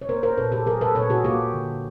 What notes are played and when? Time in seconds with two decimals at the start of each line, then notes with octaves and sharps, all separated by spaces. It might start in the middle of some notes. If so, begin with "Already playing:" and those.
0.02 C#5
0.09 A#3 A#4 C5
0.23 A#4 C5
0.38 A#2 A4 B4
0.52 G4 A4
0.66 F#3 G#4 A#4
0.81 A4 B4
0.95 A#2 B4 C#5
1.10 F#4 G#4
1.24 A#3 F4 G4
1.54 D3